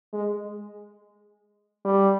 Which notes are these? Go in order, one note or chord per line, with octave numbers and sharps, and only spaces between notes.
G#3
G3